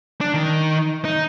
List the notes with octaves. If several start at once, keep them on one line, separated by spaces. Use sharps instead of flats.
D4
D#3
D#4